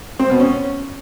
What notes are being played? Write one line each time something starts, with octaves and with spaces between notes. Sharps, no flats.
C4
B2
C#4